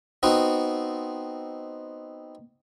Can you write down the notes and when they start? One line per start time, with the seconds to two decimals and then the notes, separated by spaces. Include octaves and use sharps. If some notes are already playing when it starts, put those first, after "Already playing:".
0.23 B3 C4 D#4 F#4